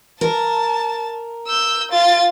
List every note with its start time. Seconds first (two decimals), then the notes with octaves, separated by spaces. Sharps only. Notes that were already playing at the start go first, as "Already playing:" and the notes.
0.21 A#4 A5
1.47 E6 G6
1.92 F4 A6